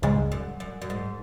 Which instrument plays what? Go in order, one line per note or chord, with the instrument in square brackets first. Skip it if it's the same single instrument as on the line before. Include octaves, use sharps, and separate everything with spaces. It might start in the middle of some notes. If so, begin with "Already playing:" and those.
[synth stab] C#2 C#3 G#3 [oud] G#2
[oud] F#2
F#2
F#2
G#2